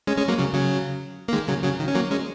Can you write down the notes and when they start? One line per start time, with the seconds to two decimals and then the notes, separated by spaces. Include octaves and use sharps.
0.07 G#3 C#4
0.18 G#3 C#4
0.28 F#3 A#3
0.38 C#3 F#3
0.54 C#3 F#3
1.28 A#3
1.33 D#3 G#3
1.48 C#3 F#3
1.64 C#3 F#3
1.80 D#3
1.88 C#4
1.95 F#3 A#3
2.11 G#3 C#4